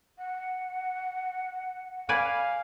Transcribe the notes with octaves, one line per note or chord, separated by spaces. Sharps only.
F#5
B4 D5 F5 G#5